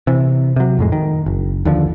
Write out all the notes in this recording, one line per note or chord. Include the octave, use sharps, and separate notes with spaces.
C3 E3
C3 F#3
F2 A2 G#3
D#3
F#1
D#2 D3 E3 F3